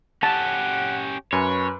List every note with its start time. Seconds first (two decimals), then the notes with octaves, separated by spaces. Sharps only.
0.23 C#4 G4 F#5 A5
1.33 F#2 B4 C#5 G#5